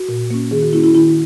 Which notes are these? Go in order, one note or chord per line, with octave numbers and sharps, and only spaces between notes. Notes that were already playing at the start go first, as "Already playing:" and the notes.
Already playing: F#4
A#2
A#3 C#4
D#3 G#4
F#4
A#3 C#4 E4
E4
D#3 E4